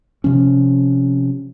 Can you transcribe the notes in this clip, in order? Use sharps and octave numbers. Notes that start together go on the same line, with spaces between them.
C3 F3 C#4